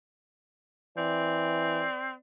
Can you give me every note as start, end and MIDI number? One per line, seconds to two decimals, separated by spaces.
0.97 1.84 52
0.97 2.12 60
0.97 2.17 74